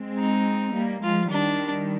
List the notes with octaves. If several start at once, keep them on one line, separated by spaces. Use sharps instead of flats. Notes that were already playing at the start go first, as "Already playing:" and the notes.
Already playing: G#3 C4
D#4
G3 A#3
F3 G#3 F4
D#3 G3 D4